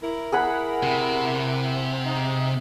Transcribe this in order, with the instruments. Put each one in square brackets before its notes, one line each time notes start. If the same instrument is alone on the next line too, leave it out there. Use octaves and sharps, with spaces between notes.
[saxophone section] E4 A#4
[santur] G#4 F#5 B5
[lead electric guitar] C3
[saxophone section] D#4